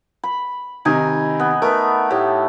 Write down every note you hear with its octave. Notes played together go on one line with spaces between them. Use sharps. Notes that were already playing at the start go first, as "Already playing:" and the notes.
B5
C3 D#3 D#4 G#5
B3
A3 A#4 B4
A2 G4